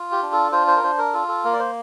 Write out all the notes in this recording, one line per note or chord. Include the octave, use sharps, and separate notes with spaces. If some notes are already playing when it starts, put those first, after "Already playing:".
Already playing: F4
G4
D4
A4
F4 C5
C5
A#4
D4 C5
A#4
F4 A4
A4
A#3 A#4
D5
C5